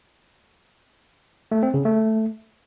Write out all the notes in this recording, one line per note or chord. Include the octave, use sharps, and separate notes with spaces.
A3
C4
C#3
A3